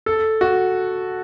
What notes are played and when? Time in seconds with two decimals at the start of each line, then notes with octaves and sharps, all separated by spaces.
0.06 A4
0.41 F#4